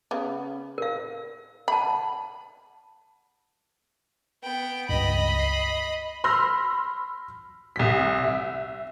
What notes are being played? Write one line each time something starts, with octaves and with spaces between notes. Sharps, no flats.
C#3 B3
A#4 F5
F#5 A5 B5
B3 G5
C#2 G2 D#5 B5
C7
B5 C6 E6 F6 A#6
C2 B6
E5